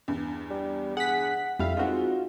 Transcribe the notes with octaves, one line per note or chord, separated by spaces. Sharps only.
E2 G2
G3
G#4 F#5 B6
F2 G3 E4 F5
G#3 C4 D#4 F4 F#4